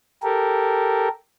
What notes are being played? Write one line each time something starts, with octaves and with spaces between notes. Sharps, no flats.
G4 A4 A#4